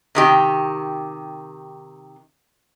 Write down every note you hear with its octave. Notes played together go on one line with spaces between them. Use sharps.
C3 D#3 G4